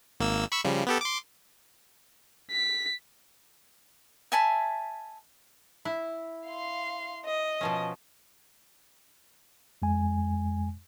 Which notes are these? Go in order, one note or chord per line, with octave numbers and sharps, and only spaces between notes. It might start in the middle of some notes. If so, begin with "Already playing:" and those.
G#1 A#3 E6
B5 C#6 E6
C#3 F3 G3
B3 G4 A4
C6 D6
B6
E5 G#5 A5 B5
E4
F5 C6
D#5
B2 F3 C#4
F2 G#3 G#5